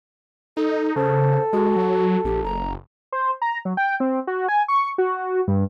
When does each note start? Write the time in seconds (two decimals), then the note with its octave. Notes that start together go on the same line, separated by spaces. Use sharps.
0.57 D#4 A4
0.96 C#3 A4 C5
1.53 G#3 F#4
1.76 F#3
2.25 A#1 G4
2.44 F#1 A#5
3.12 C5
3.42 A#5
3.65 F#3
3.77 G5
4.00 C4
4.27 F#4
4.48 G#5
4.68 C#6
4.98 F#4
5.48 G2